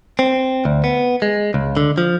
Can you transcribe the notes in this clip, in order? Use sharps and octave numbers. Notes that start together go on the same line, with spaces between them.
C4
D2
B3
G#3
C#2
D3
F3